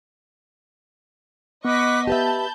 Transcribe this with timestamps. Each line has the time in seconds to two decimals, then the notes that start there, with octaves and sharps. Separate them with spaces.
1.65 B3 D#5 B5 C#6 D6 F#6 B6
2.07 G4 B4 E5 A5 B5 G6